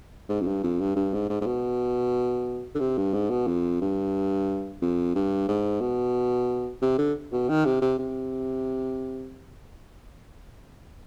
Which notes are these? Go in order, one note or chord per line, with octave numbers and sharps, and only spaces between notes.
G#2
F2
G2
F2
G2
G2
G#2
G#2
G#2
B2
D3
C3
G2
G#2
B2
F2
G2
F2
G2
G#2
B2
C3
D3
B2
D#3
C3
C3
C3